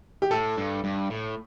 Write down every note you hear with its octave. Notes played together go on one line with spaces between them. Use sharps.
G4
A2 A4
G2
G2
A2